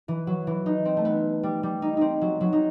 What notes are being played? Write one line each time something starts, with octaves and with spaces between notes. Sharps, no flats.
E3
F#3
E3
D#4
C4
A3
B3
G3
G3
D#4
C4 D#4
F#3
F#3
D#4